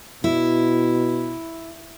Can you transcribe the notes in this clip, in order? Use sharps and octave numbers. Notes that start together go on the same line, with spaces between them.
B2 E4